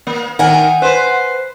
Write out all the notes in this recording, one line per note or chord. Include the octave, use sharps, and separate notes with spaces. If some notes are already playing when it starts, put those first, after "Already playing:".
A#3
D#3 A#4 F#5 G#5
B4 C5